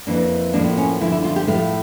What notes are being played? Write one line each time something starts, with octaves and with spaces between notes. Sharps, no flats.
F2 E3 A#3 D4
A2 F3 A#3 D4
C#4
D2 D3 F3 E4
E4
F4
G4
A2 F3 A3 F5